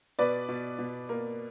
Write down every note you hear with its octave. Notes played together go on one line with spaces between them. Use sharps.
B2 B4 D5
B2
B2
A#3